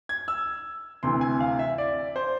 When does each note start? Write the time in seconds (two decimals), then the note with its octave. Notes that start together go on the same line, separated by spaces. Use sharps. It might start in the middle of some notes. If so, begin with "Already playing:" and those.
0.09 G#6
0.28 E6
1.03 D2 C3 E3 C6
1.21 G#5
1.40 F5
1.59 E5
1.78 D5
2.16 C5